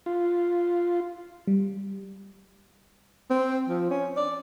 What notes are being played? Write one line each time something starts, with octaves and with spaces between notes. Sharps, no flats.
F4
G3
C4
F3
C#4
D5